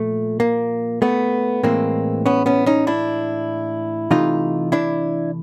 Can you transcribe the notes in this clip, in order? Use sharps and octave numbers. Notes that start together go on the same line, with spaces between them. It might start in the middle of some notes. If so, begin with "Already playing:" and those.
Already playing: A#2 F3 A3
A#3
A3 B3
A2 E3 G#3 A#3 C4
B3 C#4
B3 C#4
C#4 D#4
D4 E4
C3 E3 A3 D#4 F4
D4 E4